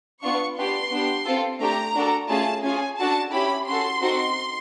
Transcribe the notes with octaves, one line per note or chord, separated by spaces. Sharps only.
B3 D4 F4 C#6
B3 D4 G4 C6
B3 D4 G4
C4 F4 A4
A3 D4 G4 A#5
D4 F#4 A4
A3 C#4 F4 G#4 A5
C#4 F4 G#4 G#5
D4 F#4 A4 A5
C#4 E4 G4 B5
C#4 F#4 A4 C6
C4 D#4 F#4 A4